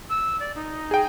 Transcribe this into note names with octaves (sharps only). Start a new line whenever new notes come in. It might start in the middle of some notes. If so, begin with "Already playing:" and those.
E6
D5
D#4
G#4 G5